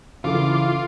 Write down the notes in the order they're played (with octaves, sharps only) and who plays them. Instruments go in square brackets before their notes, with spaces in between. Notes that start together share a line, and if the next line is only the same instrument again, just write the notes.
[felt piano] C#3 A4 [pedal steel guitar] E3 [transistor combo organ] F4 [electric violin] D6